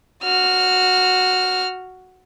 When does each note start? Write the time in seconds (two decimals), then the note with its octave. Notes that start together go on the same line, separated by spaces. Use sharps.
0.23 F#4 F6